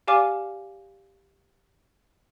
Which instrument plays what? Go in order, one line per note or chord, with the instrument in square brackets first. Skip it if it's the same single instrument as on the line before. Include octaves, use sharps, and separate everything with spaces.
[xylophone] G4 D5 F5 G#5 D6 F6